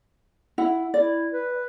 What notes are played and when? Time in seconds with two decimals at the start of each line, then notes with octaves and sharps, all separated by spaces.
0.58 E4 F#5
0.94 E4 D5
1.32 B4